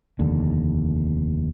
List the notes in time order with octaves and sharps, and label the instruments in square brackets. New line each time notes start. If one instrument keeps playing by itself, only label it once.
[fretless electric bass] F1 D#2 D3